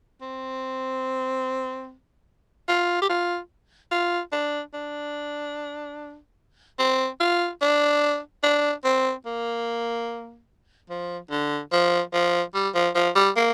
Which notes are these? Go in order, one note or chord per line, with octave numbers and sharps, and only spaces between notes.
C4
F4
G4
F4
F4
D4
D4
C4
F4
D4
D4
C4
A#3
F3
D3
F3
F3
G3
F3
F3
G3
A#3